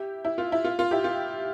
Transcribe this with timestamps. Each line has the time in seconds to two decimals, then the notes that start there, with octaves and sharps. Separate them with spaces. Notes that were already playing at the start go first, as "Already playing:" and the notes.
Already playing: E4 G4
0.25 E4
0.38 F4
0.52 E4
0.64 F4
0.79 F4
0.91 E4 G4
1.04 F4